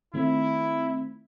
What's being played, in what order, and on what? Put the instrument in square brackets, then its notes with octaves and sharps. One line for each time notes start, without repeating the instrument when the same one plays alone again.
[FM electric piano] D#3 A3 C4 [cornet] E4